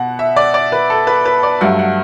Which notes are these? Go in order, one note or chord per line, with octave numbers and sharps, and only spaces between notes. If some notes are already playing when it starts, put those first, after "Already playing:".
Already playing: B2 F#5
E5
D5
D5
B4
A4
B4
B4
D5
G2 F#3 A3 F#5
F#5